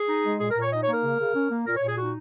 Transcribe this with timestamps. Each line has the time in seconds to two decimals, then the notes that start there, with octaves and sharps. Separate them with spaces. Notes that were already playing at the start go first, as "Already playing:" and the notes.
Already playing: G#4
0.09 D#4
0.24 G#3
0.40 A#2 G#4
0.51 A#4
0.56 A#2
0.62 C#5
0.71 D#4 D#5
0.82 C#5
0.88 A#3
0.93 A#4
1.03 C#3
1.19 C#3
1.34 C#4
1.50 A#3
1.66 A#2 A#4
1.76 C#5
1.83 A#2
1.88 G#4
1.98 D#4 F#4